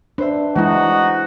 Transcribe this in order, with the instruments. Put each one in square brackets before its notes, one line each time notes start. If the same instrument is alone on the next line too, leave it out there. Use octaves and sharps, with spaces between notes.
[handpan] D4 [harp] B4 C5 E5
[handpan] E3 E4 [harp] G#3 [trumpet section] D#4 F#4